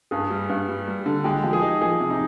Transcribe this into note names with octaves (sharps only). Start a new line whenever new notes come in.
G2 G#4
G3
G2
G3
G3
D3
G#3 G4
F3
G#4
D#4
F3 G#4
C3
D#4